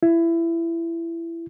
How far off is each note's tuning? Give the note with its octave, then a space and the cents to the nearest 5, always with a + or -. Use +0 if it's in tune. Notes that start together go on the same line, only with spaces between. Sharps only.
E4 +20